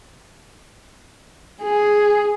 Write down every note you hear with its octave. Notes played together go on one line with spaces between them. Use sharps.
G#4